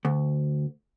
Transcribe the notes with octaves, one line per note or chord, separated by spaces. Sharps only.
D2